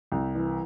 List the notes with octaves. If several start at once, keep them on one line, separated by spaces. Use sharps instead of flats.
C2
E3